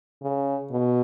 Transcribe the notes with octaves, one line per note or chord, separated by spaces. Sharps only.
C#3
B2